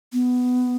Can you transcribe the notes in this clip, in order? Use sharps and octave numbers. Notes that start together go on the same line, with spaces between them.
B3